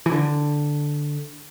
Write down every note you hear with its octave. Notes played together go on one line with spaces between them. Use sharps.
E3
D3